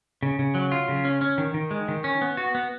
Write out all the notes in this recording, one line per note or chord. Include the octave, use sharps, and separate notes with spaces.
C#3
C#3
F#3
F4
C#3
C#4
C#4
D#3
D#3
G#3
D#3
C#4
B3
F#4
B3